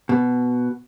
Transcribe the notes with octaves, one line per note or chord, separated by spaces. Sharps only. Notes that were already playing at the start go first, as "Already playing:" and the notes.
B2